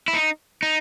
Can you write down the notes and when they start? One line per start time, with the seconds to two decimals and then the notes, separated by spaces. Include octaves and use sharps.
0.08 E4
0.14 D#4
0.62 D#4